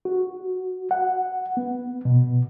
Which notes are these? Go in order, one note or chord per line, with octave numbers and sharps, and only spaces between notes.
F#4
F#5
B3
B2